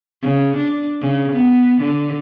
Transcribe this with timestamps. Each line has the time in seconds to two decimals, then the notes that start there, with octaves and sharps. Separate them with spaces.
0.22 C#3
0.57 D4
1.01 C#3
1.32 B3
1.81 D3